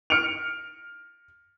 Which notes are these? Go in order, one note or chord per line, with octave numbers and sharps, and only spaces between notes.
F6 C#7 D7 F7